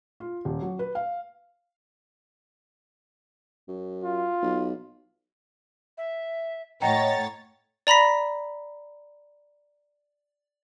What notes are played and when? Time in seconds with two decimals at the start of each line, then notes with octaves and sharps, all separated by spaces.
0.20 F4
0.45 D#1
0.62 F#3
0.79 B4
0.95 F5
3.69 F#2
4.04 F4
4.43 B1
5.98 E5
6.82 A2 C#5 D#5 F#5 G5 A#5 A6
7.87 D5 A#5 B5 A#6 B6